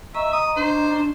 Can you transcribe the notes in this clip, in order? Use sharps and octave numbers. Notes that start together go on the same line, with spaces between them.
D#5 E5 A#5 C#6
D#6
D4 C5